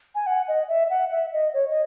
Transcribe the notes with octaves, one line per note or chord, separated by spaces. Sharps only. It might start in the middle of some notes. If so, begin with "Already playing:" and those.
G#5
F#5
D#5
E5
F#5
E5
D#5
C#5
D#5